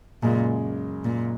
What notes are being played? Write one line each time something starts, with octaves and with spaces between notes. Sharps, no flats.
F#2 A#2 C#3 G#3
A#2